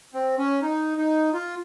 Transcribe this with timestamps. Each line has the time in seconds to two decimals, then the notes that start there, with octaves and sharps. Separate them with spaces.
0.14 C4
0.38 C#4
0.62 D#4
0.97 D#4
1.33 F4